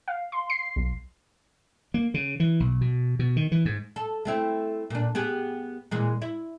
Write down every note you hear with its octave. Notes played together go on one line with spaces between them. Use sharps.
F5
C6
C7
B1
A#3
C#3
E3
B1
B2
B2
D#3
E3
G#2
A4
A3 C4 E4
A#2 D4
B3 G4 G#4
A#2 E3 G#3
E4